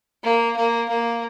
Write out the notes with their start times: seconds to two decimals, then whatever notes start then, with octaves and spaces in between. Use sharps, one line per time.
0.23 A#3
0.56 A#3
0.89 A#3